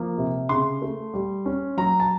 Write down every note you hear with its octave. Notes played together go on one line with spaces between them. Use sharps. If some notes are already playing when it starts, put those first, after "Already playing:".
Already playing: F3 A#3
C3
C#3 C6
A3
G3
C#4
F#3 A#5
A5